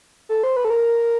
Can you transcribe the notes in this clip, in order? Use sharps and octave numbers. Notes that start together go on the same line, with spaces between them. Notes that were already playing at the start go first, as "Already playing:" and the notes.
A4
C5
B4
A4
A#4